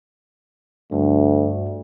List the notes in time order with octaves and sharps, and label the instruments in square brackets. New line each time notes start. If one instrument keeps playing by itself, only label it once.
[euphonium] D2 [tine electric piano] G2